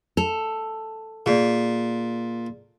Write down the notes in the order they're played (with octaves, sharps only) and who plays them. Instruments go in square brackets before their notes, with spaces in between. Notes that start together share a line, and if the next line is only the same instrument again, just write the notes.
[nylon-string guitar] A4 [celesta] F7
[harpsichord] A#2 [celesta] G#4 D5